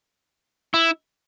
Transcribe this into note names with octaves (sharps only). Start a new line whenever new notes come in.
E4